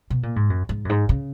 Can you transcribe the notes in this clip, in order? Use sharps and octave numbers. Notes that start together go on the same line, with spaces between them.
B2
A#2
G#2
F#2
G#2
F#2
G#2
C#3